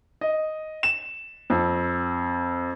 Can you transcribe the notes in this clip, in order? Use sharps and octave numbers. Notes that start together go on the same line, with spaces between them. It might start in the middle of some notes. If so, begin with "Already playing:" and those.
D#5
E7
F2